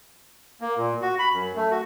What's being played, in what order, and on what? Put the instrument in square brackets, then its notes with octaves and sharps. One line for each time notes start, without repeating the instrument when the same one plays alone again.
[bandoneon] A#3
A#2
F#4
B5
F#2
A3
F#4